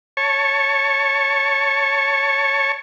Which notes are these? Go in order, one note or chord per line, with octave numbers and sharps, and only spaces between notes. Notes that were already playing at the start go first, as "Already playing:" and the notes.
C#5 A5 C#6